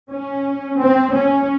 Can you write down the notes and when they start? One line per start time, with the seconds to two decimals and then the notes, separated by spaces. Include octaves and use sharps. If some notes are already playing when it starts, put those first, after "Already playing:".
0.11 C#4
0.80 C4
1.14 C#4